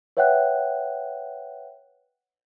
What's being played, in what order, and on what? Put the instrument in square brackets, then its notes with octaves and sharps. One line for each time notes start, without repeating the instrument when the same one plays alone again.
[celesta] B4 C#5 E5 F#5 G5 F#6